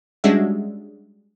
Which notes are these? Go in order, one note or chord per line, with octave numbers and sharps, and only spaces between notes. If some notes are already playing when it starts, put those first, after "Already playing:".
G3 G#3 C#4 D4 F#4 E5